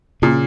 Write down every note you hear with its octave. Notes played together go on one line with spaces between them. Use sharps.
A#2 C#3